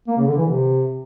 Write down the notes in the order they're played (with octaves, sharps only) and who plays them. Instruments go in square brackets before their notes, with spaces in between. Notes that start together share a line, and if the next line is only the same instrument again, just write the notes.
[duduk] A#3
C#3
D3
E3
C3